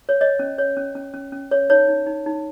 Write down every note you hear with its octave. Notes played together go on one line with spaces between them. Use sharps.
C#5
C#5 D#5
C#4
C#5
C#4
C#4
C#4
C#4
C#5
D#4 C#5
D#4
D#4
D#4